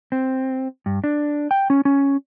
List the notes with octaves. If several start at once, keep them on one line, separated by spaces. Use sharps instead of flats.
C4
G2
D4
G5
C#4
C#4